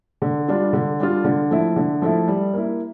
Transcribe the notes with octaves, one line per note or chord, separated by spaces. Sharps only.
D3
G3 D4 F4
D3
G3 D4 F4
D3
F3 A3 E4
D3
F3 A3 E4
G3
A#3 E4